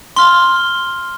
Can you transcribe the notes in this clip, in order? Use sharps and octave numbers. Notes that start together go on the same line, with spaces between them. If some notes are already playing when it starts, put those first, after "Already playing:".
C6 F6 G7